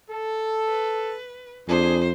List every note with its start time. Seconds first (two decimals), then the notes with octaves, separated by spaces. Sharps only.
0.10 A4
0.69 B4
1.68 F2 D4 G#4 C5